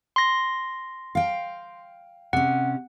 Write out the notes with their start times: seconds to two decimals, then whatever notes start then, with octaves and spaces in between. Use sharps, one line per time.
0.16 C6 A#6
1.15 F5 G5
2.33 C3 C#4 F#5